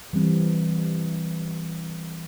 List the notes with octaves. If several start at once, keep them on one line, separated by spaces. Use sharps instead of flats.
E3 G3 C4